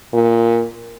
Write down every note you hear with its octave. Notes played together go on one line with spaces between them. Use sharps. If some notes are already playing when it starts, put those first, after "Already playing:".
A#2